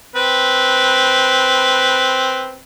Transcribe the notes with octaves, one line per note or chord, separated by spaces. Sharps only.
C4 B4